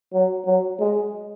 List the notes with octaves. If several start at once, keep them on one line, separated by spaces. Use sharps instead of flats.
F#3
F#3
G#3